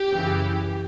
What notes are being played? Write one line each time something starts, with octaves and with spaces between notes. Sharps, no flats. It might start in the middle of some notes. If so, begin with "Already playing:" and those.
Already playing: G4
F#2 C#3 E3